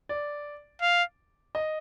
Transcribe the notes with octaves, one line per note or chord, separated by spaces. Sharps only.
D5
F5
D#5